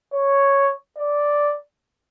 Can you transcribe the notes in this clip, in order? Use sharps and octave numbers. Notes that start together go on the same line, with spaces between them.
C#5
D5